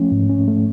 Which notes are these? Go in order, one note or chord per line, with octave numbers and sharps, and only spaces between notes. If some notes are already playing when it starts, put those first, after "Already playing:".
Already playing: F3 A3 C#4
G#2
C#4
A3